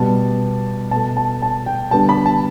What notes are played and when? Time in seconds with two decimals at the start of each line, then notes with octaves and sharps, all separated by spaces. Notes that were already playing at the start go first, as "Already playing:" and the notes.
Already playing: B2 G3 B3 A5
0.91 B2 A3 A5
1.17 A5
1.42 A5
1.66 G5
1.91 D3 G3 B3 A5
2.09 B5
2.26 A5